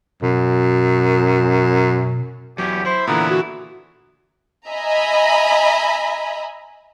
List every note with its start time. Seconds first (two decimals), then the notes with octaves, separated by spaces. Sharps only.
0.22 F#2 B2
2.58 E2 F#3 C#4 G4
2.86 E4 C5
3.07 A#2 D3 E3 B3 A#5
3.29 F#4
4.69 D#5 E5 G#5 A#5 B5